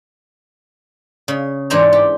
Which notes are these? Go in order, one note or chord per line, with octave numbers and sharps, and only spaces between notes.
C#3
G#2 E3 D4 C5 A#5
G4